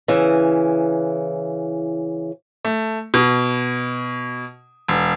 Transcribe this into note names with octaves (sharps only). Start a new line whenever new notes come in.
C#3 E3
A3
B2
E1